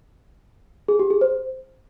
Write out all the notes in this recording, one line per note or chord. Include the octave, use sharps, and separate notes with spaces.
G#4
G4
G#4
C5